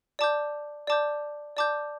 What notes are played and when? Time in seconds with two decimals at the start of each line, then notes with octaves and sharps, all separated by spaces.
0.19 D5 A5 D6 G6
0.87 D5 A5 D6 G6
1.57 D5 A5 D6 G6